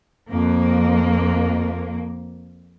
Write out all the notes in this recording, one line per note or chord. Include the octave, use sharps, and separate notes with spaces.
F2 A#3